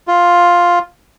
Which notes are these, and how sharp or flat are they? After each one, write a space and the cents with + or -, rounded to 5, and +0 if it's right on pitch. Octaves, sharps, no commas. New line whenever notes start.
F4 +5